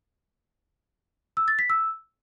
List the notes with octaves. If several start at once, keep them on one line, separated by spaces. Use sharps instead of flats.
E6
A6
B6
E6